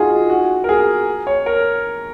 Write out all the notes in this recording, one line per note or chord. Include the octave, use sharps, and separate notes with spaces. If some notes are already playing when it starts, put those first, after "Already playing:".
Already playing: D#4 F4 F#4 G#4
F#4
A#4
G#4
C#5
A#4